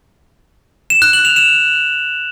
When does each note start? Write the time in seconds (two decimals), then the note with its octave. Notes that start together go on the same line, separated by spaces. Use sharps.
0.90 E7
1.02 F#6
1.13 F#7
1.25 F7
1.36 E7